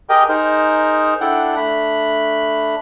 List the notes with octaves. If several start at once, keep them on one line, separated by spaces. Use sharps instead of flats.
G4 G#4 A#4 D#5 G5
D#4 G#4 A#4 C5
D4 E4 A4 D5 F#5 G5
A3 D4 B5